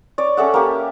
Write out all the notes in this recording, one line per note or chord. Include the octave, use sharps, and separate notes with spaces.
C#5 D5
C#4 A4 E5 F#5
A#3 G4